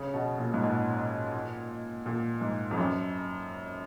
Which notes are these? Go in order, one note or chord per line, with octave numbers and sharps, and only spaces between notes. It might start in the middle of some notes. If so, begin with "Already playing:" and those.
Already playing: C#3
B2
A#2
G#2
A#2
A#2
G#2
F2
F#2